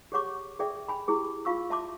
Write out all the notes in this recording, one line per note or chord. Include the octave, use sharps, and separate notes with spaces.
G4 G#4 C#5 F#5 C#6 D6
G#4 A4 D5 E5 G5
G5 G#5 B5
E4 G4 G#4
F4 F5 C#6 E6
E5 A5 C6 D6